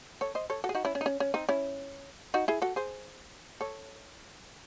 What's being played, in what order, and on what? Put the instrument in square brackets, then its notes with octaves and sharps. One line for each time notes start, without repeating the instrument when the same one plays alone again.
[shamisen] A4 C#5
C5 D#5
A4 C#5
F#4 A4
G#4
D#4 F#4
C#4 E4
C#4
D#4
C#4
C#4
C4 D#4
C#4 E4
D#4 F#4
E4 G#4
F#4 A4
G#4 C5
A4 C#5